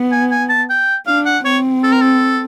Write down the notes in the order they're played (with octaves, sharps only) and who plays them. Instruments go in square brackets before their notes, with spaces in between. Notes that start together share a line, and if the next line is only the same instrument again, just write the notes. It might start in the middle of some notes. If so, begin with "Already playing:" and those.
Already playing: [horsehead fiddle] B3
[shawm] G#5
G#5
A5
G5
[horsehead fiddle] D4 [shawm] F5
[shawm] F#5
[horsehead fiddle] C4 [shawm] C#5
[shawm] A4
A#4
A4